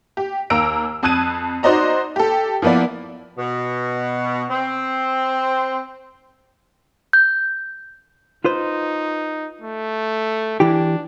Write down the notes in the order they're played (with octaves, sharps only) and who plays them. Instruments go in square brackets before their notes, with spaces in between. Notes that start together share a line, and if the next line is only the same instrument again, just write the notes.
[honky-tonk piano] G4
D#2 A#3 A#5 E6 D7
F2 A5 D#6 F#6 G#6 D#7
D#4 F#4 C5 D5 D#5 A#5
G4 A4
F3 A#3 B3 E4 D5
[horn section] B2
C4
[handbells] G6
[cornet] D#4 [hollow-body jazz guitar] F4 B4 C5
[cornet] A3
[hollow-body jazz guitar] E3 E4 G4 [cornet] D4